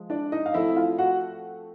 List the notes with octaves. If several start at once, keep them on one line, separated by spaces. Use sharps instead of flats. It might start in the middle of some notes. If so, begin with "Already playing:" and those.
Already playing: F3 G#3
D4 D5
D#4 D#5
F5
F3 A3 C4 E4 E5
F4 F5
F#4 F#5